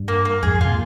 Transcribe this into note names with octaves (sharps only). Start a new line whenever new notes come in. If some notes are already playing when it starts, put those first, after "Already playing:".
Already playing: G2
A#3
A#3
F2 G#2 G#4
D3
C3 F4
A#2